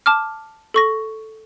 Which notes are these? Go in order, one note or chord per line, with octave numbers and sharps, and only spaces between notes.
A5 D6 F6
A4 C#6 A#6